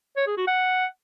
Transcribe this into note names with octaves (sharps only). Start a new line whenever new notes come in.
C#5
G#4
F#4
F#5